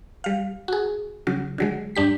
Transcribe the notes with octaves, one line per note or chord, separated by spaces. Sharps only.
G3 F5
F#4 G#4
C#3 F#3
D3 F#3 G#3
G2 D4 G4 B6